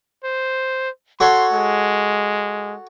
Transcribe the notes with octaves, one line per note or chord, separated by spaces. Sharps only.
C5
F#4 A4 C#5 C6
G#3